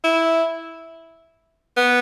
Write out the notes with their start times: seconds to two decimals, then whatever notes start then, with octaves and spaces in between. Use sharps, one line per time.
0.04 E4
1.77 B3